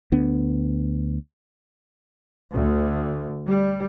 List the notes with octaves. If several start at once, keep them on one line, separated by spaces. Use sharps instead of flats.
D2 B3 D4
D2
G3